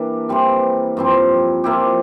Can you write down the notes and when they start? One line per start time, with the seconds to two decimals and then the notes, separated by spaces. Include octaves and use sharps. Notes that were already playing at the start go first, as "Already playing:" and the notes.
Already playing: E3 G3 A#3 D4 E4
0.29 E3 G3 C4
0.97 G2 F3 C4
1.64 F3 A#3 E4 G4